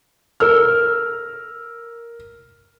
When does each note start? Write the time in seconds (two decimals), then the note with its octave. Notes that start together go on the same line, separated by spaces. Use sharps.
0.40 A#4 E6 F6